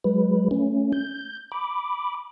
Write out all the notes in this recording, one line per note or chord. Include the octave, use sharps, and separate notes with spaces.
F#3 G#3 B4
A3 C#4
G6
B5 D6